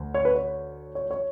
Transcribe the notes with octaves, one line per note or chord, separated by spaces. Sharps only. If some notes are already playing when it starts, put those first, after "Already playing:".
Already playing: D2
C#5
B4
C#5
C#5
C#5